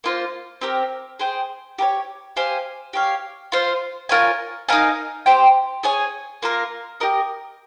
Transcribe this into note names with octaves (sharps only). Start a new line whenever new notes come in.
A#3 F4 C5
C4 G4 A#4
G#4 C5 G5
G4 A#4 C#5
G4 C5 F5 G#5
G4 C#5 F5
F4 C5 F5
F4 A#4 C#5 G#5
D#4 A#4 F5 G#5
G4 C5 G5
G#4 C#5 G#5
A#3 F4 A#4
G4 A#4 D#5